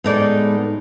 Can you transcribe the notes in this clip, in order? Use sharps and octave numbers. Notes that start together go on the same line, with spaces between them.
A2 G#3 B3 D#4 D5